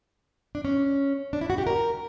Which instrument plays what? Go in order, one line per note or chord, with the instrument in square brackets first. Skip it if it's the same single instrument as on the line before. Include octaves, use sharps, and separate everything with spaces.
[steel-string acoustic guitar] D4
C#4
D4
E4
F#4
G4
A#4